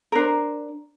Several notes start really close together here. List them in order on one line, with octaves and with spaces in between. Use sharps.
A#4 D4 C5